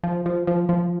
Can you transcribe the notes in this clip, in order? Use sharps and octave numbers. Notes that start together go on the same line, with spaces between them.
F3
F3
F3
F3